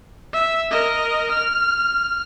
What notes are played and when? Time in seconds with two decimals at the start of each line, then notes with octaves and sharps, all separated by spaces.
0.33 E5
0.71 A#4 D#5
1.32 F6